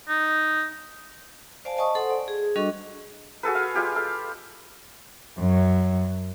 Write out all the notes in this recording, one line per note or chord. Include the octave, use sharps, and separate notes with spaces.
D#4
C5 D5 F5 G#5 A5
D#5 G#5 A5 C#6 D#6
A4 C5 F#5 G#5 C6 D#6
D5
G#4
G3 D4 F#4 A4 D#5 C#6
F#4 G#4 A4 B4
F5
G#3 F4 G4 G#5
A4 F5
F#2